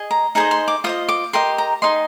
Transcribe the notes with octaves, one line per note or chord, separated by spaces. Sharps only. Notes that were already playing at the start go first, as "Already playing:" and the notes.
Already playing: G#4 D#5
A#5
D#4 G#4 C5 D#5 A#5
C6
D6
F4 C5 D#5 D#6
D6
G4 A#4 D#5 C6
A#5
D#4 G#4 D#5 C6